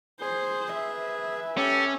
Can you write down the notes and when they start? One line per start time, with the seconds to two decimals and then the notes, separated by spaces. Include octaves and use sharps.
0.21 G#4 C5
0.74 B4 E5
1.57 C#4 G4 A4